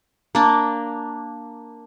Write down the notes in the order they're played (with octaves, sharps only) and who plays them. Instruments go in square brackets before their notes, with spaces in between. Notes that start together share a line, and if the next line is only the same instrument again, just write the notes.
[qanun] A#3 D4